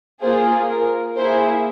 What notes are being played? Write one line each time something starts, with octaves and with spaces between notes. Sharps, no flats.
A#3 F4 G#4 C5
A#4
A#3 E4 G#4 C5